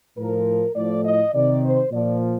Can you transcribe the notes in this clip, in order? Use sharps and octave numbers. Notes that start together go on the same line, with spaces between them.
A2 F3 A#4
A2 F3 D5
D#5
C3 D#3 D5
C5
A#2 F3 D5